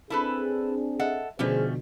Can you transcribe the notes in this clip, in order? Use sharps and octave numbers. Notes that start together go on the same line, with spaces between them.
C4 D4 E4 G#4 A4 B4 A5
A4 D#5 E5 F#5
B2 D3 F3 G3 A3 C#4 G#4 C5